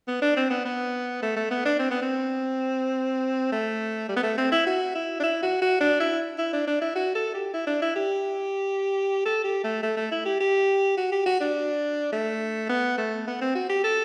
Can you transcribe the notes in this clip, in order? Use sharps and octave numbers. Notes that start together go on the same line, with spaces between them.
B3
D4
C4
B3
B3
A3
A3
B3
D4
C4
B3
C4
A3
G3
B3
A3
C4
E4
F#4
E4
D4
E4
F#4
F#4
D4
E4
E4
D4
D4
E4
F#4
A4
G4
E4
D4
E4
G4
A4
G4
A3
A3
A3
E4
G4
G4
F#4
G4
F#4
D4
A3
B3
A3
B3
C4
F#4
G4
A4